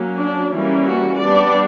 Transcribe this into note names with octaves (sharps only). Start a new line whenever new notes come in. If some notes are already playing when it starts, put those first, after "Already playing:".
Already playing: F#3 A#3 C#4
D4
E3 G3 A#3 C#4
F#4
G3 B3 D4 D5